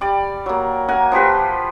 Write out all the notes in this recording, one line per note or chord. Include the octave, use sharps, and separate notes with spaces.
G3 D5
F#3 A#3
A#4 F#5 G#5
F3 F4 G4 B4